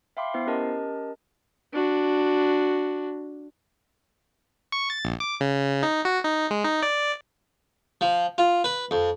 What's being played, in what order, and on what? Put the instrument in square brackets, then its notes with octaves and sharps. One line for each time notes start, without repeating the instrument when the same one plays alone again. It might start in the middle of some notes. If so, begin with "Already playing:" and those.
[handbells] E5 F5 G5 B5 C6 D6
B3 E4 C5 C7
C#4 G4 A#4 D#5 A5
[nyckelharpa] D4 F#4
[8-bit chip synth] C#6
A6
A#1
D6
C#3
D#4
F#4
D#4
G#3
D#4
D5
[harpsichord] F3
F4
B4
F2